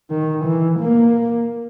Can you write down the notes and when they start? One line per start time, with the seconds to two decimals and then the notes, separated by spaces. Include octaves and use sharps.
0.11 D#3
0.45 E3
0.80 A#3